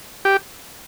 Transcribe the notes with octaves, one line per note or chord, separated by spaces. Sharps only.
G4